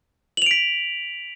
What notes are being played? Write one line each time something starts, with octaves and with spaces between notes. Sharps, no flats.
B6 D7 F7 F#7